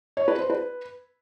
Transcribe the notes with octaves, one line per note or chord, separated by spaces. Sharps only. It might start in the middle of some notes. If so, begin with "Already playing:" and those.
C#5
B4
C5
B4